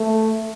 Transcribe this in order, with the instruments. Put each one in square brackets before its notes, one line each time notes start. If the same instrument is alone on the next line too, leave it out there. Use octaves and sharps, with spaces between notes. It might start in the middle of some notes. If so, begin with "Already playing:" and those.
Already playing: [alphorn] A3